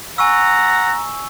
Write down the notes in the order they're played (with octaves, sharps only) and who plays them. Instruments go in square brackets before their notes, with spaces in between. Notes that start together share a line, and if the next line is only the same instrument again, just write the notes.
[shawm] F#5 [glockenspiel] G#5 C#6 E6 [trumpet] A#5